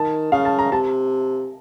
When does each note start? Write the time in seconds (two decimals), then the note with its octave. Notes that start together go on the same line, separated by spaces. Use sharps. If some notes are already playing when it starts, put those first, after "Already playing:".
Already playing: D#3 A5
0.32 C#3 F5
0.45 A5
0.59 A#5
0.72 C3 A5